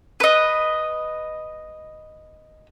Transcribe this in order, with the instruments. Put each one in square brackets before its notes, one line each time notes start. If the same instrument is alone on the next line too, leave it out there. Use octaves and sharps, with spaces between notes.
[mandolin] B4 D#5